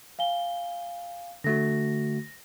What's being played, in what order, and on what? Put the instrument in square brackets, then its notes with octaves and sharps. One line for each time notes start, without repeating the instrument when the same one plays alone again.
[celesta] F5 G#5 G7
[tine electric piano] D3 A3 F#4 [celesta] A#6